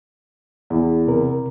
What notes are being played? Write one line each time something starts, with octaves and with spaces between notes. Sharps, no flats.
E2
C3 A#4